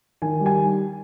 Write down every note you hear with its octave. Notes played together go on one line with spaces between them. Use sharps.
D#3 G#5
G3
G#5